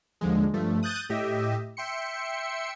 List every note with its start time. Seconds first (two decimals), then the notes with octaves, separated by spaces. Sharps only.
0.21 D#2 D3 F3 G#3
0.54 G2 F3 A3
0.83 D#6 F#6 G6 A6 D#7
1.09 A2 G4 D#5 E5
1.77 E5 G5 C6 C#7